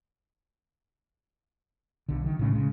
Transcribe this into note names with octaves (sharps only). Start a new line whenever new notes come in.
B1 D3
D#3
A2 C#3 A3
C#3 G#3